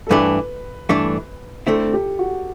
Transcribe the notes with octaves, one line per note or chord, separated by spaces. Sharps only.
A4
G2 E3 A3 D4 B4
G2 E3 A3 D4
D3 A3 C4 E4 A4
G4
F#4